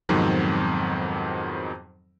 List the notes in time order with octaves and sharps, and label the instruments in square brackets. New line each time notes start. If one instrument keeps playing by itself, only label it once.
[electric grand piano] F2 G#2 B2 D#3 F#3 C4